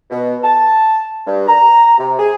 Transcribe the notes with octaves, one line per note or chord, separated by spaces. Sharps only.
B2
A5
G2
A#5
C3
G#4